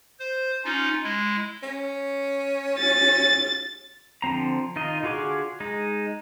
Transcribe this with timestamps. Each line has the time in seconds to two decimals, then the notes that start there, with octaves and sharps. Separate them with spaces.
0.20 C5
0.65 C#4 D#4 F4
1.04 G#3 E4
1.63 C#4
2.79 A6
4.22 D3 F3 C4 A#5
4.76 D#3 D#4 F4 D#5
5.03 D3 F4 F#4 G#4 D6
5.60 G#3 D#4